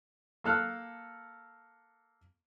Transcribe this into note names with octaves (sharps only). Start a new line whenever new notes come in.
A#3 A4 F6 F#6